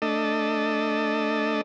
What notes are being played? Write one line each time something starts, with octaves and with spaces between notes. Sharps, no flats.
A3 D4 A4 D#5